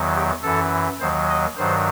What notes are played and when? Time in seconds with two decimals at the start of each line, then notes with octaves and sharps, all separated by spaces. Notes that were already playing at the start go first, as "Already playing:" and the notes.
Already playing: E2 D#3 F#3
0.15 G4
0.43 F#2 E3 A4
1.00 D#2 D#3 F#3 C5
1.29 D#5
1.57 G2 D#3 F#3 C5